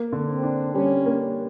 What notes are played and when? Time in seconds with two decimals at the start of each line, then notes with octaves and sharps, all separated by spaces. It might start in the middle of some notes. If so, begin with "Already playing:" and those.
Already playing: A#3
0.13 D3
0.28 C4
0.43 D4
0.74 G3 C#4
1.06 A#3